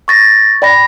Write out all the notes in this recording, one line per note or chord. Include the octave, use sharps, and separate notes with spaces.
C#6 A6 A#6
D5 G5 B5 A#6